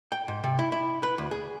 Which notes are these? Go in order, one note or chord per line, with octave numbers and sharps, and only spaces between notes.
G5
G#2
C3
E4
E4
B4
D2
G#4